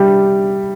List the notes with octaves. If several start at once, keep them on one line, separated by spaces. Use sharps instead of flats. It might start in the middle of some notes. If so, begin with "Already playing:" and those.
Already playing: G3 E4 G4